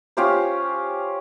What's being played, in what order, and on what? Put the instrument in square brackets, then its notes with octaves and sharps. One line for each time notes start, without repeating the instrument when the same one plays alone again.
[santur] C#4 F4 G4 C5